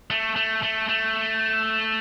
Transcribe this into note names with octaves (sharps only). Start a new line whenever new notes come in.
A3
A3
A3
A3